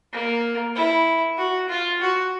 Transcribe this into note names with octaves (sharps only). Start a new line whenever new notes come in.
A#3
E4
F#4
F4
F#4